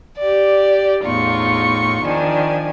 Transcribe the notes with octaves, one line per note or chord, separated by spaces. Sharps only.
G4 D5
E2 A2 D#4 F4 C#6
D#3 F3 D4 G#5